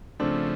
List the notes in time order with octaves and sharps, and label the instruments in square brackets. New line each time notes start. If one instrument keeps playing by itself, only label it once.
[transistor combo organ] C#3 F3 A3 [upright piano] C4 D4